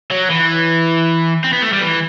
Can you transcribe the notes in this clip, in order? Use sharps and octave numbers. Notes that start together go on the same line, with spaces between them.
F#3
E3
C4
B3
A3
G3
E3